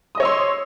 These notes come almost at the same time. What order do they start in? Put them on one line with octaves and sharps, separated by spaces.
D#6 D#5 C#5 E6 C6